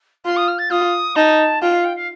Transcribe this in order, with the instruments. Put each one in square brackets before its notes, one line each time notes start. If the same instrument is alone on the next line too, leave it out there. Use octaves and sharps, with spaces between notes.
[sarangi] F4 [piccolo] C6
[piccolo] D#6
F6
A6
[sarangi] F4 [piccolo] D#6
[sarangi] D#4 [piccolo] A5
[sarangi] F4 [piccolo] G5
[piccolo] F5
G5
F5